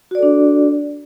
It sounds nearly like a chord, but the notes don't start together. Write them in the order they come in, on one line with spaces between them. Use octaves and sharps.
F#4 D5 A4 D4